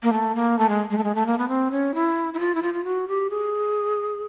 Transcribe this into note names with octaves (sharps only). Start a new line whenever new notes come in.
A#3
A3
A#3
A3
G#3
G#3
A3
G#3
A3
A#3
B3
C4
C#4
E4
E4
F4
E4
F4
F4
F#4
G4
G#4